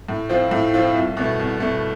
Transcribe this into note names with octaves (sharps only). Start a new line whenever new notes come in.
A2
F3 C4 F4
A2
F3 C4 F4
C2
B2 A3
C2
B2 A3